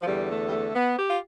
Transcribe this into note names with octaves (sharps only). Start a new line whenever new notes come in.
F3
E2 D3 G3
A3
G3
A3
B3
G4
F4